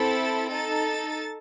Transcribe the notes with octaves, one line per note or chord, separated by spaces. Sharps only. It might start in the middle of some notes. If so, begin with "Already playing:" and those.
Already playing: C4 E4 A4 A6
D#4 A4 A6